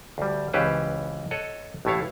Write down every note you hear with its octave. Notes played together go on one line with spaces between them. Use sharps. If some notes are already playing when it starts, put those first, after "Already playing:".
D2 G3
C#2 E3 C#4 G4 B4 C5
A4 C#5 D#5 F#5
A1 A2 A3 E4 C#5 F5